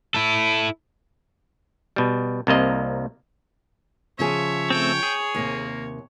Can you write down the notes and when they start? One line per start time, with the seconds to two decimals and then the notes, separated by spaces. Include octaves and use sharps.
0.14 E4 A4
1.96 B2 G3
2.47 C2 C3 A#3 D#5
4.19 C#3 F3 G#4 C#5 E5
4.70 A3 C4 G5
5.03 G#4
5.35 D#2 A2 C3 A#3